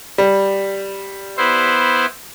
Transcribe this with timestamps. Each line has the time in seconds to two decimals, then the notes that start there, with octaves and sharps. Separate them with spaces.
0.18 G3
1.37 B3 E4 C5